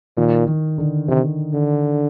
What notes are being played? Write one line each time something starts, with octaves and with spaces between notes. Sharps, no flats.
A#2 D#3
D#3
D3
C3 D#3
D3